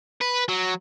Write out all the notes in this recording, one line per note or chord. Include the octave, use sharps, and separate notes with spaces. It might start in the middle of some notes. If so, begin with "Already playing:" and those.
B4
F#3